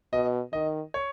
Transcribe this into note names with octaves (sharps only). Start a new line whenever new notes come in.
B2 D#5
D#3 D#5
C#5